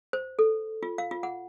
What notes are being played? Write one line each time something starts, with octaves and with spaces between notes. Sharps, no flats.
C5
A4
F4
F5
F4
F#5